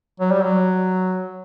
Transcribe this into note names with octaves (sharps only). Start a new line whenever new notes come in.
F#3
G3
F#3